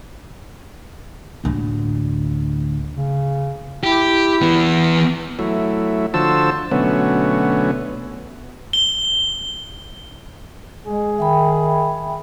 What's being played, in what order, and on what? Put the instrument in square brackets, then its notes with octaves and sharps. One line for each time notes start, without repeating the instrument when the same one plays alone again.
[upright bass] D2 A2
[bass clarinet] C#3
[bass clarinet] E4 [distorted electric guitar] G4
[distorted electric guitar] E3 B3
[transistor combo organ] F#3 A3 E4
D3 F3 F#4 C5 A5 E6
B2 D3 F#3 A3 B3 C#4
[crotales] G7
[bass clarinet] G#3 [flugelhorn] G#4
[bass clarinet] D#3 [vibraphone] E5 G5 B5